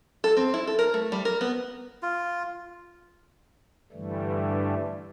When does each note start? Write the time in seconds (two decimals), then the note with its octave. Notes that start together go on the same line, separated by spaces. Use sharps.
0.24 A4
0.37 C4
0.54 E4
0.67 A4
0.79 A#4
0.94 A3
1.12 G3
1.25 A#4
1.41 B3
2.02 F4
3.92 G2 D3 E3 G3 A3